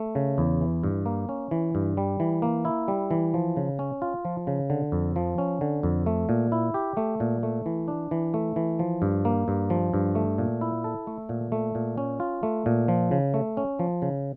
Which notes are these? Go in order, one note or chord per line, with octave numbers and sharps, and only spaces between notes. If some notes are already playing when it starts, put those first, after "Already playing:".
Already playing: A3
C#3
E2
E3
G2
A#3
C#4
E3
G2
G3
E3
A#3
E4
G3
E3
F3
C#3
C#4
F4
F3
C#3
D3
F2
F3
C#4
D3
F2
A3
A#2
E4
G4
A3
A#2
A3
E3
D4
E3
A3
E3
F3
G2
A#3
G2
F3
G2
A3
A#2
E4
A4
A3
A#2
A3
A#2
C#4
F4
A3
A#2
F3
C#3
A3
C#4
F3
C#3